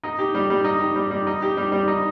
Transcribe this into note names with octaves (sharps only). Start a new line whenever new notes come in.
D#4
G4
G3
G3
D#4
G4
G3
G3
D#4
G4
G3
G3
D#4